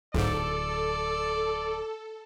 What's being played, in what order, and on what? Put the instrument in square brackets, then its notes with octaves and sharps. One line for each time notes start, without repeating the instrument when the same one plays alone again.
[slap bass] D1 [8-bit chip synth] B1 G#2 [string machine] A4 [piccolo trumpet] D5